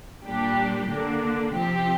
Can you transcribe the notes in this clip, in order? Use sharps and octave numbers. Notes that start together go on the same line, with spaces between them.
A#2 G3 D4 G4
D3 A#3 D4
C3 F3 C4 G4